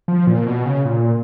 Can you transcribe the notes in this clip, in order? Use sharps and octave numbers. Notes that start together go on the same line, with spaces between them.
F3
A#2
B2
C#3
A#2